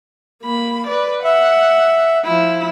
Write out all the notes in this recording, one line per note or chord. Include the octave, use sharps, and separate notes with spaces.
A#3 B5
B4 D5
E5 F#5
F3 E4